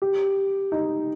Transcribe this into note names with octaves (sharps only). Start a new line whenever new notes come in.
G4
D#4